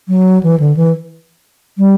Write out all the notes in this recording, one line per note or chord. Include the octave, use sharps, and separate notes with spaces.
F#3
E3
D3
E3
G3